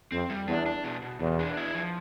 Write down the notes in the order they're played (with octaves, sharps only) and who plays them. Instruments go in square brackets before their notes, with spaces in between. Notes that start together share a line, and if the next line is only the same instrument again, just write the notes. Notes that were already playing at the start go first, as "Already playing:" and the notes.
[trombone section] F2 [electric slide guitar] C4
[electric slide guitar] G3
[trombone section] E2 [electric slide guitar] D4
[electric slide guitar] D4
B2
B2
[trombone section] E2 [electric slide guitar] B2
[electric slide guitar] D4
E4
F3